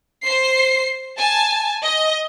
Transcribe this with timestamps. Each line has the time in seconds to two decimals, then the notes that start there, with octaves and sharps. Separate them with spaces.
0.24 C5 C7
1.17 G#5 A5
1.81 D#5